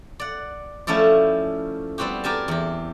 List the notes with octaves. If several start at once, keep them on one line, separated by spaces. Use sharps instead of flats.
D5 F#5
F3 A3 C#4 E4 D5
G3 B3 C4 F#4 G4
G4 A#4 G#5 A5
E2 G4